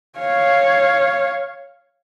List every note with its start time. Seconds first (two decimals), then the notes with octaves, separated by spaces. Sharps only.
0.19 C#5 F5